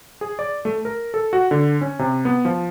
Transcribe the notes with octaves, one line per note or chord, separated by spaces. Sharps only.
G#4
D5
A3
A#4
A4
F#4
D3
C#4
C3
B3
F3